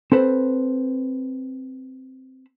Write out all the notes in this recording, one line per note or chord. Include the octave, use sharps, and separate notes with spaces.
C4 A4 B4 C5